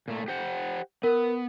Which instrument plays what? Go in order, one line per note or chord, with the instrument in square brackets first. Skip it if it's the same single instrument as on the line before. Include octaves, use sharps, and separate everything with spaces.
[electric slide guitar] A#2 A3
G4 C5 F#5
[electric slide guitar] B3 [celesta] A#4